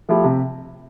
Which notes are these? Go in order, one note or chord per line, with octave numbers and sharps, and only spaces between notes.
F3 A3 E4 G4
C3